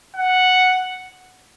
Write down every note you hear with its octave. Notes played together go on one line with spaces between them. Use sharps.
F#5